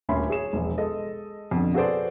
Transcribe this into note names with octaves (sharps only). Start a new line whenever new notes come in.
D#1 D2 C#4 E5 B5 C6
G#4 C#5 E7
E1 A#1
G#3 A4 D#5
F2 B2 D3
F#4 G#4 A4 B4 C5 D5